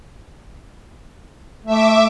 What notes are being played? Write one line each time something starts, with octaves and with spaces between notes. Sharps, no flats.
A3 E5 D6